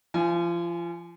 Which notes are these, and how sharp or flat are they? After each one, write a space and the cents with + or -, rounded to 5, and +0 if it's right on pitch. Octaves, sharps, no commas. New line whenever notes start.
F3 -30 G#5 +0